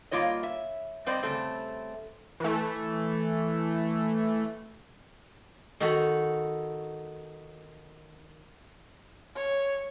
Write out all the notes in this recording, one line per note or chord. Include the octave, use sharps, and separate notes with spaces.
G3 A#3 F4 C#5 D#5
E5
G3 C4 C5 D5 D#5
C#3 G3 A3 C4
E3 A3
D#3 D#4 F#4 A4 B5
C#5